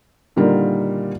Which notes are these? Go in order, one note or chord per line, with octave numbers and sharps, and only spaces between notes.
A#2 D3 D#3 G3 F4 A#4